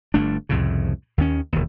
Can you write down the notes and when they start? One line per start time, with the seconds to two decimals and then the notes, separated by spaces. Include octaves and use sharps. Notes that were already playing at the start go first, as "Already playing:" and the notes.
0.14 G1 G2 A3 D4
0.49 C2 F2 A2 C#3
1.18 D#2 D#3 C#4
1.53 E1 D#2